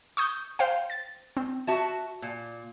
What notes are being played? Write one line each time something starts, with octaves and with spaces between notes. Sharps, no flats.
C#6 D#6 G6
C5 F5 G5
A6
C4
F#4 E5 A5
A#2